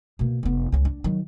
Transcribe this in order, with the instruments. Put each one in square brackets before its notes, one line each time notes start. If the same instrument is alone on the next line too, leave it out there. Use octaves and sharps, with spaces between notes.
[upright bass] B2 A#3
F1 B3
C#2 C#4
D4
D#3 F#3